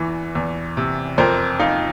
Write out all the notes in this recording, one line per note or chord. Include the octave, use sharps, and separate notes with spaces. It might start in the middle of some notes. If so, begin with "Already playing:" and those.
Already playing: E2 E3
E2
C3
F2 A#4 C5
F3 D#4 F4